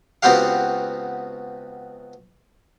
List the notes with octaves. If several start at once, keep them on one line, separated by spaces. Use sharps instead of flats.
C#2 B3 C4 F#4 G4 F5